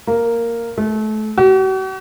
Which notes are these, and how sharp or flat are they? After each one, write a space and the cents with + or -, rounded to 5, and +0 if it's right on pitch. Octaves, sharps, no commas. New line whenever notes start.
A#3 -5
A3 -30
F#4 +45